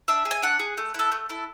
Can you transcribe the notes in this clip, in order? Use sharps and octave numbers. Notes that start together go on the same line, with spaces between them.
D4 E5
G#4
G#5
D4 F#5
G#4
A3
E4 A4
A3
E4 A4